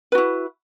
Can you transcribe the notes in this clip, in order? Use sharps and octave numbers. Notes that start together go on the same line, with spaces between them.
E4 F#4 B4